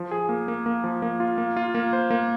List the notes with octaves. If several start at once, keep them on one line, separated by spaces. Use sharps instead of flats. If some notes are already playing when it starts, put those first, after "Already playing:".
Already playing: F3
G#4
A#3
A#3
A#3
F3
A#3
F4
A#3
F4
A#3
C5
A#3